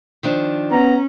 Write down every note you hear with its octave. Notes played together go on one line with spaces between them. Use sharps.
D#3 F3 D4
B3 C#4 A#5